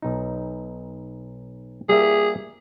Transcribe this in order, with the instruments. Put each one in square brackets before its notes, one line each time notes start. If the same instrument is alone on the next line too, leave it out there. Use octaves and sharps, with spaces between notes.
[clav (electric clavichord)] B1 D#4
[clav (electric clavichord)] G3 A#3 E5 [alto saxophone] G#4